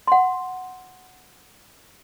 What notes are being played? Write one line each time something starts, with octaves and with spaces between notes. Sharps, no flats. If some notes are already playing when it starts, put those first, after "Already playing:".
F#5 C6